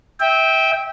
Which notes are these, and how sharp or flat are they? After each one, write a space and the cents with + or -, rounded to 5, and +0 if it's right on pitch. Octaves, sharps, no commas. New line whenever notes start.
E5 -25 G5 +0